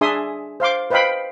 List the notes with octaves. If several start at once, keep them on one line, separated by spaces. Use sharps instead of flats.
D4 G#4 E5 G#5 C6 D#6
C5 F5 C6 D6
B4 C5 D#5 F5 G5 B5